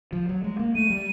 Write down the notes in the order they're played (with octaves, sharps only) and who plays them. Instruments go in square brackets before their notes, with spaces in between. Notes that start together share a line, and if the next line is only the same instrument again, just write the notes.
[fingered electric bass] F3
F#3
G#3
A#3
[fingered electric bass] A3 [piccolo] D#7
[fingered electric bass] G3